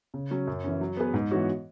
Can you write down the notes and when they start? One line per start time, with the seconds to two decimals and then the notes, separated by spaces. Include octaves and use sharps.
0.14 C#3
0.31 F#3 C#4
0.48 F#2
0.64 E3 C#4
0.81 F#3
0.97 B3 G#4 B4
1.14 G#2
1.31 E3 B3 F#4 C#5